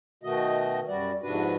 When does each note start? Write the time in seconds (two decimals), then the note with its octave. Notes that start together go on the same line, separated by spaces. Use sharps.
0.23 B2 D#3 A3 F#4 D#5
0.88 F#2 G3 F#4 D5
1.22 F2 G#2 C3 D4 F#4 B4